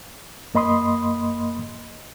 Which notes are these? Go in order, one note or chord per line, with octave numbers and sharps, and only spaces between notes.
F#2 A#3 D#5 B5 C6 D#6